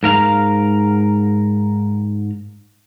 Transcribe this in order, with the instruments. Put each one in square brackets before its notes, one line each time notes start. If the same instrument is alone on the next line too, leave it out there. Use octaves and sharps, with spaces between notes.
[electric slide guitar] G#2 A#4 F5 A#5